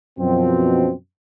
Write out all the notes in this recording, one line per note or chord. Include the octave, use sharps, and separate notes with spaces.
F#2 B2 F3 C4